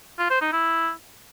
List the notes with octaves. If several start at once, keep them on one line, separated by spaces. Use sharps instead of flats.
F4
C5
D#4
E4